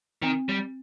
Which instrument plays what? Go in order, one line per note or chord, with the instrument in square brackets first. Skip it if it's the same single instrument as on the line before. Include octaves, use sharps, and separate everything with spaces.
[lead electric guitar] D#3 [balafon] C4
[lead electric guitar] G3